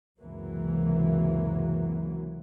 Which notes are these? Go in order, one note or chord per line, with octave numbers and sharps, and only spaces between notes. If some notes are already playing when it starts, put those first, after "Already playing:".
C#2 F#2 C3 E3 F#3 A#3